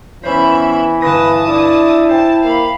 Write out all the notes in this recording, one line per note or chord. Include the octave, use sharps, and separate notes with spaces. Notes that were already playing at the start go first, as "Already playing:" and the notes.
E3 B3 C#4 C5 E5 B5
G1 B4 A5 D#6 A#6
D4 E4
C5 G5 A5
A#3 F5 B5